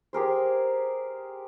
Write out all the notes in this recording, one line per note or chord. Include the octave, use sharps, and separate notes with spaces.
G4 G#4 A#4 C5